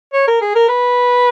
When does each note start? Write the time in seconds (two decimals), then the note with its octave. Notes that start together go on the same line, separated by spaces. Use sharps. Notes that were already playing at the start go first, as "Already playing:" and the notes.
0.13 C#5
0.28 A#4
0.41 G#4
0.55 A#4
0.69 B4